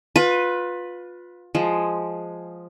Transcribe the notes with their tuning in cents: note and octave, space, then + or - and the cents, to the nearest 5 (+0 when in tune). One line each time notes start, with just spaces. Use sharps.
F4 +25 B4 +0
F3 +0 G#3 +0